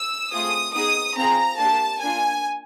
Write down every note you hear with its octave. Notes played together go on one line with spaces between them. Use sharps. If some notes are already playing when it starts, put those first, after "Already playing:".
Already playing: E6
A3 C4 F4 G#4 D#6
B3 D#4 G#4 D#6
C4 F4 G#4 A#5
A#3 D4 G4 A5
A#3 D4 F4 G#5